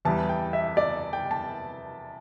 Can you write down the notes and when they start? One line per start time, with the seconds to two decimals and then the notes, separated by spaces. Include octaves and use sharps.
0.05 E2 E3 G3 A5
0.29 G5
0.53 E5
0.77 D5
1.13 G5
1.31 A5